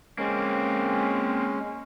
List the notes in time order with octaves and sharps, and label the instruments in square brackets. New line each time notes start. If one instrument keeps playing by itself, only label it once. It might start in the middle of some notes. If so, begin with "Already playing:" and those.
[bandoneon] G#3 C#4 [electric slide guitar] A#3 C4